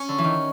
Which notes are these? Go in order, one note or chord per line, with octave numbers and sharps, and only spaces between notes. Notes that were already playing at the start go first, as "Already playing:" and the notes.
Already playing: C#4
D3
E3
D#3